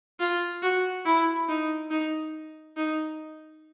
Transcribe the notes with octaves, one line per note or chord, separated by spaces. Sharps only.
F4
F#4
E4
D#4
D#4
D#4